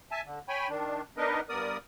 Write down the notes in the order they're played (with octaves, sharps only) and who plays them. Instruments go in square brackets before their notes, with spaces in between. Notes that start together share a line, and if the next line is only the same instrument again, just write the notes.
[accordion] E5 G#5 A5
D3
C#5 G5 G#5 B5
D#3 D4
B3 D4 D#4 A#4 B4 D#5
G2 B3 A#4 D5 D#6